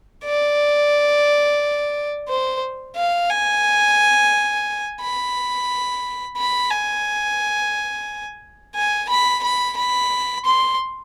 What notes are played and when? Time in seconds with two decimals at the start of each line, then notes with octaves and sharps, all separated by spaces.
0.24 D5
2.29 C5
2.96 F5
3.30 G#5
5.01 B5
6.37 B5
6.71 G#5
8.75 G#5
9.09 B5
9.43 B5
9.77 B5
10.45 C6